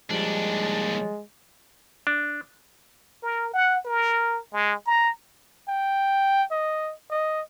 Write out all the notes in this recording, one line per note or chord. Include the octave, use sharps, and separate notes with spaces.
D#2 F3 G3 G#3 D4
D4
A#4
F#5
A#4
G#3
A#5
G5
D#5
D#5